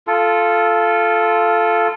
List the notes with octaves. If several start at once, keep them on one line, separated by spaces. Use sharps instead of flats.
F4 A4